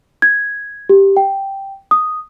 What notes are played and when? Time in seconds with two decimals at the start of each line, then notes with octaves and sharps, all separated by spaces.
0.22 G#6
0.89 G4
1.17 G5
1.91 D#6